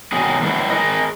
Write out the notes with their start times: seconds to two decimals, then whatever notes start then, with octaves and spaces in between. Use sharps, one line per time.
0.12 B2 D#3 F#3 G#4
0.43 F#3 G#3 C4 E4 B4
0.70 G#4 A#4 D#5